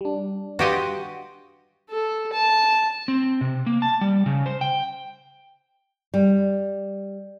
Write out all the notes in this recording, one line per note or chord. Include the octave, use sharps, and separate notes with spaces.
G3 D4
F#4 G4 B4 D#5 F5 C6
A4
A5
C4
C3
A#3
A5
G3
C#3
C5
G5
G3